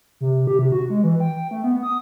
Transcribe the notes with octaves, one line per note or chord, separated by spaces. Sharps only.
C3
G4
C3
F#4
G#3
E3
G5
A3
B3
D#6